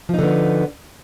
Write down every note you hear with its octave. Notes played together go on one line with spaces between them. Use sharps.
D3 F3 B3 D#4